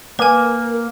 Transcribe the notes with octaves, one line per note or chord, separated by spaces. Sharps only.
A#3 A#4 B4 G#5